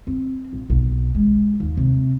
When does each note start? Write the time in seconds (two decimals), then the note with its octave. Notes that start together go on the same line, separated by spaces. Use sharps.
0.07 C4
0.53 A#1
0.70 B1
1.15 G#3
1.60 D#2
1.77 C3